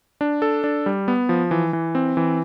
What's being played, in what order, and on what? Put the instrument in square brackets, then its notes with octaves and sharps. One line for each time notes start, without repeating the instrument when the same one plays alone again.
[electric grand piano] D4
A4
D4
G3
B3
F3
E3
E3
C4
E3